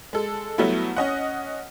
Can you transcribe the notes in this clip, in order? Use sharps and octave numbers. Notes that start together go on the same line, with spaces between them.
G#3 A4
F#3 G3 A3 B3 E4
C#4 D#5 F#5